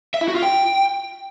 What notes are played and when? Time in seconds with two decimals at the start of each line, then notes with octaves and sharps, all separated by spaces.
0.14 E5
0.21 E4
0.28 F#4
0.35 F4
0.43 G5